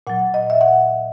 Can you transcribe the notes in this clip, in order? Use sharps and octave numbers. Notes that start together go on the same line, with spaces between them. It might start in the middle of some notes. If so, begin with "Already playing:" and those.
A#2 F#3 F#5
D#5
E5
F#5